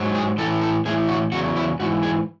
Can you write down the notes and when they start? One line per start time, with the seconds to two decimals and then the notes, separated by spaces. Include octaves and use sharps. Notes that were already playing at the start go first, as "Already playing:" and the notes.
Already playing: G#2 F#3
0.15 G#4
0.38 E3 A4
0.42 A2
0.62 A4
0.85 A2 E3 G#4
1.09 F#4
1.32 E2 C#3 F#3 F#4
1.56 E4
1.80 G#2 E3 F#4
2.03 G#4